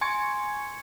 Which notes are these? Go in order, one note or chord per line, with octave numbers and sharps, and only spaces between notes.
G#5 C6 C#6 G#6 C#7